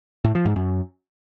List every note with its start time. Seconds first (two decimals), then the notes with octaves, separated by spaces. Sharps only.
0.24 A2
0.35 F3
0.45 G#2
0.56 F#2